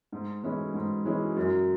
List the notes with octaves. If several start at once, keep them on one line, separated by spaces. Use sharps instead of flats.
G#2
E3 G#3 C#4 E4
G#2
E3 G#3 C#4 E4
F#2